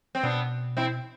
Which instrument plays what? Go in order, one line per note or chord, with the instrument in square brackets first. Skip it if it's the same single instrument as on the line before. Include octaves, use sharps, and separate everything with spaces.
[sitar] C4
[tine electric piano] B2 [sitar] B3 D4
[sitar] C4 E4